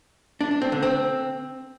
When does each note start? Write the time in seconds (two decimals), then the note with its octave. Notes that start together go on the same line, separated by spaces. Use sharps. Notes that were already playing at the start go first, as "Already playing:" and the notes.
0.41 D4
0.51 D4
0.62 C4
0.72 D3
0.83 C4